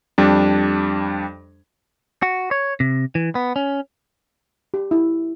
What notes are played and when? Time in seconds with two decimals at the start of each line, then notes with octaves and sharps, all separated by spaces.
0.18 F2 G3 D4
2.22 F#4
2.51 C#5
2.80 C3
3.15 E3
3.35 B3
3.56 C#4
4.74 G4
4.91 E4